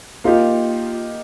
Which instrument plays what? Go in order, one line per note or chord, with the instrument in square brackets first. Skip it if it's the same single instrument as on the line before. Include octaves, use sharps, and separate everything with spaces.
[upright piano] A#3 D#4 G4 [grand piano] F4